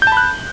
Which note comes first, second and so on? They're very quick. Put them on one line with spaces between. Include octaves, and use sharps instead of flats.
G6 A5 B5 F#6